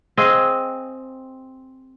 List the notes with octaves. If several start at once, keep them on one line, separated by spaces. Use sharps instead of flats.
C4 G#4 D#5 F5